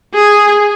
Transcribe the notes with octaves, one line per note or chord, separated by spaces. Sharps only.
G#4